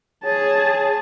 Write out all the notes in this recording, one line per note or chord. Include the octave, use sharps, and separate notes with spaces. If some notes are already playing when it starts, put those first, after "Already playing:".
G#4 C#5 A5